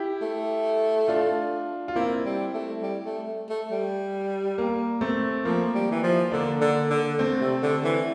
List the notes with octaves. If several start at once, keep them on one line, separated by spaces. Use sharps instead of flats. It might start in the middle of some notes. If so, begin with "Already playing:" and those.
Already playing: E4 G4
A3
D4 F4
F4
A#3 C4 E4
G3
A3
G3
A3
A3
G3
A#3
A3 C4
F3 A#3
G3
E3
F3
D3 A#3 D4
D3
D3
A3 C4
C3
D3
E3